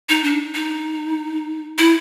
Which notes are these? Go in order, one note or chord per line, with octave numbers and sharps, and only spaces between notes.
D#4
D4
D#4
E4